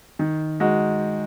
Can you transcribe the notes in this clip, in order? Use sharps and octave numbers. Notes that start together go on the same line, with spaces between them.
D#3
G#3 D#4 F#4